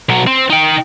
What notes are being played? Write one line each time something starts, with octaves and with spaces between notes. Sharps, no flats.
B1 F#3
C4
D#4 G5